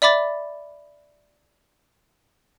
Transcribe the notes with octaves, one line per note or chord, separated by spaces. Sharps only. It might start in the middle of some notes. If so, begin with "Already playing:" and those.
D5 E5 B5 D6 A6